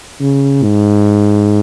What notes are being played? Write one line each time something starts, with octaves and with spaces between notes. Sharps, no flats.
C#3
G#2